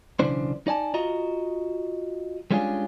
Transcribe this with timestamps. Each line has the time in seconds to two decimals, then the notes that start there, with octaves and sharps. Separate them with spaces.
0.19 B1 C#3 E3 D4 C5
0.67 D#4 D5 G#5 A5
0.94 F4 F#4 D#5 A#5
2.51 G3 G#3 C#4 D4 F4 G#4